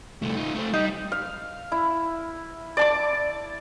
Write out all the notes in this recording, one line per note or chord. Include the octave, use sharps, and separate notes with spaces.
C2 A3
D#4 F4
A3 C4
G3 D#4
F5
E4
D5 A5 D6